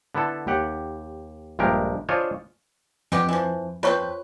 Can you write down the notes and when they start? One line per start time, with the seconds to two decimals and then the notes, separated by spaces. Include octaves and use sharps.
0.15 D3 B3 E4 A4
0.47 D#2 G4 F#5
1.59 A#1 G2 G#3 G4 A#4
2.09 D4 F4 G#4 C5 C#5 D#5
3.12 F2 G#3 B3 G4
3.29 E3 F3
3.83 F3 C4 F4 B4 C#5 C#6